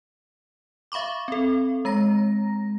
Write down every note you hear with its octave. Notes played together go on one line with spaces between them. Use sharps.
E5 F5 B5 C#6 D6
C4 A4
G#3 A#5 A#6